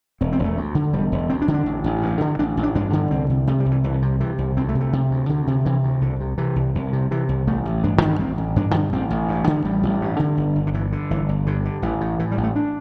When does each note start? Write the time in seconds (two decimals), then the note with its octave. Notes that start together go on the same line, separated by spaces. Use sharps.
0.21 E1 C4
0.33 C4
0.39 E1
0.45 A3
0.57 D2
0.75 D3
0.93 E1 G3
1.12 E1
1.30 D2 C4
1.42 D4
1.48 D3
1.54 D4
1.66 A1
1.84 A1
2.02 G2
2.21 D3
2.39 A1 D4
2.57 A1
2.63 D4
2.75 G2 D4
2.93 D3
3.11 C2 C4
3.30 C3
3.47 C3 A3
3.60 G3
3.66 C2
3.71 E3
3.84 C2 E3
4.02 C3
4.20 C3 E3
4.38 C2
4.57 D2 C4
4.69 A3
4.75 C3
4.81 A3
4.93 C3
5.11 D2
5.29 D2 D3
5.47 C3
5.65 C3 E3
5.83 D2
6.01 C2 D3
6.20 C3
6.38 C3 E3
6.56 C2
6.75 C2
6.93 C3
7.11 C3 E3
7.29 C2
7.47 A1 A3
7.65 A1
7.84 G2 D4
8.02 D3
8.19 A1 C4
8.38 A1
8.56 G2 D4
8.74 D3
8.93 A1 C4
9.10 A1
9.28 G2
9.47 D3
9.65 A1 G3
9.83 A1
10.01 G2
10.19 D3
10.37 G1
10.56 G1
10.67 D3
10.74 G2 E3
10.92 D3
11.10 G1 E3
11.29 G1
11.46 G2 D3
11.65 D3
11.82 A1 E3
12.01 A2
12.19 A2 E3
12.31 G3
12.38 A1
12.44 A3
12.56 D4